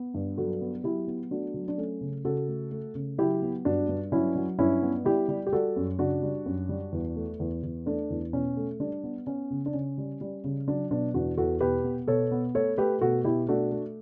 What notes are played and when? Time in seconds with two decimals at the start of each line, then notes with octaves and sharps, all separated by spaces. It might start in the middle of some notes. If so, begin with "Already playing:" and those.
Already playing: B3
0.14 G2
0.37 F#3 F#4 A4
0.61 B3
0.84 F#3 E4 G4
1.07 B3
1.31 A3 D4 F#4
1.54 F#3
1.68 D4
1.78 A3 C#4
2.01 C#3
2.25 C#3 F#4 A4
2.48 A3
2.71 A3
2.95 C#3
3.18 F#3 E4 G4
3.42 B3
3.65 G2 D4 F#4
3.89 G2
4.12 F#3 C#4 E4
4.35 F#3
4.59 G2 C#4 E4
4.82 B3
5.05 G3 E4 G4
5.29 G3
5.47 G4
5.53 G3 F#4 A4
5.76 F#2
5.99 C#3 D4 F#4
6.23 G3
6.46 F#2
6.69 G3
6.92 E2
7.16 A3
7.40 E2
7.63 E2
7.86 A3 D4
8.10 E2
8.33 B2 C#4
8.57 A3
8.80 G3 D4
9.04 B3
9.27 B3 C#4
9.51 C#3
9.66 D4
9.74 C#3 C#4
9.98 G3
10.21 G3
10.44 C#3
10.67 F#3 D4
10.91 B2 D4
11.14 E2 D4 F#4
11.38 E2 F#4 A4
11.61 B2 G4 B4
11.84 B3
12.08 B2 A4 C#5
12.32 B3
12.54 A3 A4 C#5
12.78 A3 G4 B4
13.01 B2 F#4 A4
13.24 B2 E4 G4
13.48 A3 D4 F#4
13.72 A3